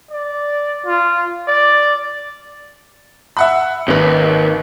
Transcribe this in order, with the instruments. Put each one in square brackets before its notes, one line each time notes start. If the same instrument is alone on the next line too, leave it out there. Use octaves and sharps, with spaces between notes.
[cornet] D5
F4
D5
[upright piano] E5 F#5 B5
[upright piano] G#1 [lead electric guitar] D#2 [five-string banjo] C#4 B4